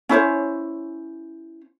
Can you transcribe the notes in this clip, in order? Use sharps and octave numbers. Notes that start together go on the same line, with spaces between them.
C#4 E4 C5 C#5